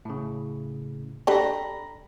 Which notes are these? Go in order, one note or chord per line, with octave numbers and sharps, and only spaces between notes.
A2 C#3
D4 G4 A4 A#5 B5 A#6